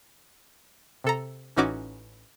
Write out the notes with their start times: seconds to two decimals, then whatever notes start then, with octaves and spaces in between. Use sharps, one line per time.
1.04 C3 A4 A#5
1.56 A1 E3 C#4 D#4 F#4 D6